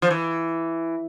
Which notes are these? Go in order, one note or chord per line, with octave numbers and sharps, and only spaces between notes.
F3
E3